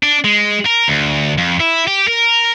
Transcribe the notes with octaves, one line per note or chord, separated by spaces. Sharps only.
D4
G#3
A#4
D2
F2
E4
G4
A#4